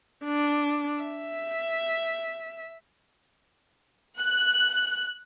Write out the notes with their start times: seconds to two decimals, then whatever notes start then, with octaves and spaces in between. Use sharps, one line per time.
0.25 D4
1.02 E5
4.18 F#6